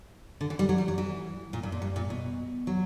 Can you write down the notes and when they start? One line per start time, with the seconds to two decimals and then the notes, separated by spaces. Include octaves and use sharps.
0.41 D3
0.50 E3
0.59 G3
0.69 F#3
0.78 G3
0.88 F#3
0.98 E3
1.53 A#2
1.63 G2
1.72 A#2
1.82 G2
1.96 A#2
2.10 B2
2.67 F#3